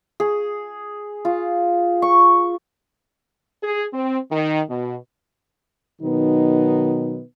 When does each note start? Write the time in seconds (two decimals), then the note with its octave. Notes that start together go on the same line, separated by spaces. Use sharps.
0.20 G#4
1.25 F4
2.02 C#6
3.63 G#4
3.93 C4
4.31 D#3
4.70 B2
6.02 B2 D#3 F#3 B3 D#4